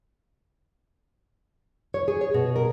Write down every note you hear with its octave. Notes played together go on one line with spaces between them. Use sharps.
C#5
G#4
C#5
B2
A#4